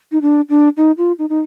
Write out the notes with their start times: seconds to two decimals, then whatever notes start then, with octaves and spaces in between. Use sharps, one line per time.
0.12 D#4
0.22 D4
0.49 D4
0.77 D#4
0.98 F4
1.19 D#4
1.29 D#4